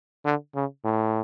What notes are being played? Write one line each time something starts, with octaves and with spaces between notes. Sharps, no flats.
D3
C#3
A2